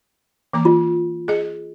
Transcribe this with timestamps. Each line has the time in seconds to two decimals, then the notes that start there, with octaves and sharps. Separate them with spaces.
0.53 E3 A#3 A#5
0.65 F4
1.28 G#4 D#5